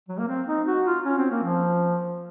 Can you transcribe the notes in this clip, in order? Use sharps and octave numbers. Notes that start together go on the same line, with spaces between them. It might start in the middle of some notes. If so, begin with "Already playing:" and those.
F#3
A#3
C4
D#4
F#4
F4
C#4
C4
A#3
F3